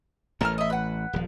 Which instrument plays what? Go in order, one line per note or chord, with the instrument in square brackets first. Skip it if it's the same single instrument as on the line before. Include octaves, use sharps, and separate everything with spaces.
[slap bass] A1 E3 A3 [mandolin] A#4 A5 F6
[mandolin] D#5 E5
B4 F#5
[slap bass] D#1 F3